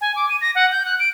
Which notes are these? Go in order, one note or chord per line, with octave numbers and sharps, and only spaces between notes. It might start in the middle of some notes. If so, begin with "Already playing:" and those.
G#5
D6
D#7
A#6
F#5
G6
F#6
D7